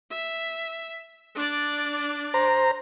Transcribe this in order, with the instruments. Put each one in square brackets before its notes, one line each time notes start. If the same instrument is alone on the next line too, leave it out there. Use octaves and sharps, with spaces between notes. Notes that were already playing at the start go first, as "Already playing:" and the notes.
[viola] E5
D4 D5
[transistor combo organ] C5 A#5